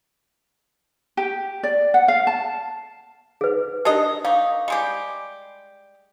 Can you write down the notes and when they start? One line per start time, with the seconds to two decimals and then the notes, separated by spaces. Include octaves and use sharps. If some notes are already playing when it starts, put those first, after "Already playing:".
1.17 G4
1.63 D5
1.94 F#5
2.08 F5
2.27 A5
3.41 G#4 B4
3.85 D4 D#4 G4 A#4 D#5 A5
4.25 D#4 F5 C#6 D6
4.68 G3 G#3 G4